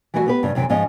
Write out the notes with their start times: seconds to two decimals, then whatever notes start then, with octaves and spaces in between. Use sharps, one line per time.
0.14 E3 G3 A3 F#4 F#5 G#5
0.26 B3 G4 B4
0.43 G2 C#3
0.55 F#2 C3 E3 G5
0.70 G#2 F3 C#4 D#5